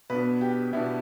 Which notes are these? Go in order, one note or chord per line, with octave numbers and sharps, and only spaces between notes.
B2 B3 D4 B4
G4
B2 B3 D4 E4